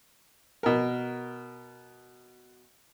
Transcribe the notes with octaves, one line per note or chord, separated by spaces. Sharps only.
B2 A#4